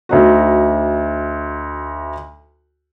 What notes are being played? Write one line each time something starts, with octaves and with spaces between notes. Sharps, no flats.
D2 D#4 F#4